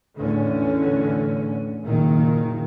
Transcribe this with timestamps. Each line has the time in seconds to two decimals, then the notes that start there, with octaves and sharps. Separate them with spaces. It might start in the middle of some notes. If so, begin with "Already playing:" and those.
0.16 E2 A2 D3 C#4
1.82 F#1 A#2 D#3